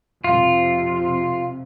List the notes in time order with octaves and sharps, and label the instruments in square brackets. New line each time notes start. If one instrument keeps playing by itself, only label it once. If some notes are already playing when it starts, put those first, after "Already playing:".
[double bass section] F2 C3 [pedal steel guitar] F4